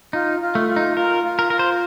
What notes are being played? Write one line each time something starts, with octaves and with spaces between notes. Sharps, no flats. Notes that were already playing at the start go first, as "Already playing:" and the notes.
D#4 F4
F4
A3
F4
D#4
F4 A#4
F4
A#4
F4 A#4
C5